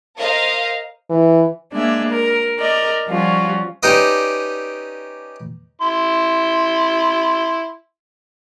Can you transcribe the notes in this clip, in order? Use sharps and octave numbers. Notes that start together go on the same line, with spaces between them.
A#4 C5 D#5 F5 A#5
E3
G#3 A#3 D4 E5
A#4
A#4 D5 D#5
F3 G3 C#4 F4 F#4
C#4 D#4 G4 B4 D5 D#5
E4 C6